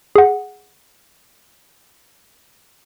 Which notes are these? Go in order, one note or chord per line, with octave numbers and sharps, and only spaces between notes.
G#4 F#5